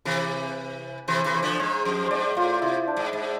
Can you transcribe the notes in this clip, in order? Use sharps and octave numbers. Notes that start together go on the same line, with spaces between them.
C3 E3 B4
C3 E3 C5
C3 E3 B4
C5
D3 F3
G#2 C5
F2
G#2 C5 D5
A2 F4
C3 E4
D4
G#2
G#2